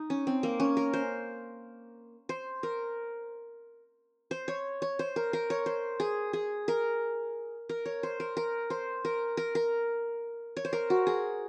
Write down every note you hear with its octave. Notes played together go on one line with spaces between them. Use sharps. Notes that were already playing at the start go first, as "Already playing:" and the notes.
Already playing: D#4
C#4
C4
A#3
C#4
A#4
C5
C5
A#4
C5
C#5
C#5
C5
A#4
A#4
C#5
C5
G#4
G#4
A#4
A#4
C#5
C5
A#4
A#4
C5
A#4
A#4
A#4
C#5
C5
A#4
F#4
G#4